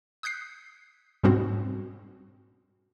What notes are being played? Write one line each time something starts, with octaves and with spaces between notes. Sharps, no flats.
D#6 F#6 G6 B6 C7
G#2 B2 G3 C4 C#4 F#4